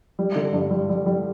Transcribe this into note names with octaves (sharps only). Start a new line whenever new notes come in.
G3
D3
G2
G3
G3
G3